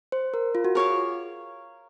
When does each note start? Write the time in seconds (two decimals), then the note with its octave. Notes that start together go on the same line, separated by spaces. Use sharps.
0.12 C5
0.34 A#4
0.55 F4
0.65 F#4
0.75 G#4 A#4 C#5 F5